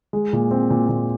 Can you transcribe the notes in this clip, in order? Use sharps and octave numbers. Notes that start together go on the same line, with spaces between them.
G#3
A#2
C4
A#2
A#2